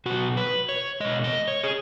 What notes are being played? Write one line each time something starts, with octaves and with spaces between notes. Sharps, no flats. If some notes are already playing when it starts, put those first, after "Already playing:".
B2 F#3 F#4
B4
C#5
B2 G#3 D#5
D#5
C#5
G#4